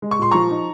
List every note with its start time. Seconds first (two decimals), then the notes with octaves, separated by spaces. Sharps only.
0.02 G#3
0.11 C#6
0.19 A#2 C6
0.31 F3 A#5 C#6
0.50 D#4